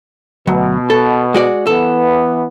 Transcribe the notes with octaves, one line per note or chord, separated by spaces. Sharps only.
D2 B2 F#3
A4
G#3 F#4 D5
E3 B3 A4